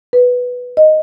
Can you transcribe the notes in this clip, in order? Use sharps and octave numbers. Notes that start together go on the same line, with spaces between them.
B4
D#5